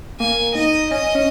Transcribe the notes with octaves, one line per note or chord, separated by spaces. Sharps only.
A#3 G#5
D#4 D#5
C#4 D#5
C#4